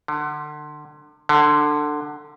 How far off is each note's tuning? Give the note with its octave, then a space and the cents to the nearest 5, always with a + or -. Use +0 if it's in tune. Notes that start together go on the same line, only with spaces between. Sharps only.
D3 +30
D3 +15